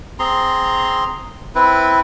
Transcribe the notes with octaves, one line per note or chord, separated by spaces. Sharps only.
C4 G#4 A#5 C6
C4 E4 B4